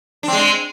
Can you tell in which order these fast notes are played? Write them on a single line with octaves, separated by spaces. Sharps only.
D4 C4 G#3